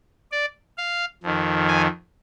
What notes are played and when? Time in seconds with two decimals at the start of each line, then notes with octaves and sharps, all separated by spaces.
0.32 D5
0.77 F5
1.23 F2 D#3
1.68 G#5